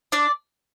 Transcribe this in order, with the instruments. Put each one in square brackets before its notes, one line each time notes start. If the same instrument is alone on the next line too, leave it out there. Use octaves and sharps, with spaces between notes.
[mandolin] D4 D5